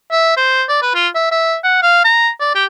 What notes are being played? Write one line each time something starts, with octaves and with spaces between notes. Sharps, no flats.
E5
C5
D5
B4
F4
E5
E5
F#5
F5
A#5
D5
G4